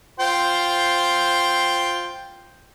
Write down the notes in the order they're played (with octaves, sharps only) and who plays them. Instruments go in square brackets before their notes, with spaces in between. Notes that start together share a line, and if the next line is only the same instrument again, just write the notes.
[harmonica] F4 C5 G5